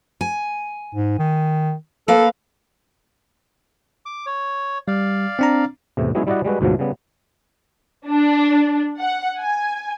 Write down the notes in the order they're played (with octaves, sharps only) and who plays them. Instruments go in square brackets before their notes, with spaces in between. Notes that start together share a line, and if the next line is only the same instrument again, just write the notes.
[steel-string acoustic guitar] G#5
[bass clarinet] G#2
D#3
[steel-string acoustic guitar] A#3 B4 F5 [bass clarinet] A4
[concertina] D6
C#5
[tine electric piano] G3 [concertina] D5 F5
[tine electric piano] C4 D4 A#5
[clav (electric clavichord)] E2 A2 C3
F#3 G#3 B3 C#4 E4 G#4
G3 E4 F#4 D5 D#5 F#5
G3 G#3 F#4 B4
D2 G#2 B2 F3 F#3
C#3 G3 B3
[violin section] D4
F#5
G#5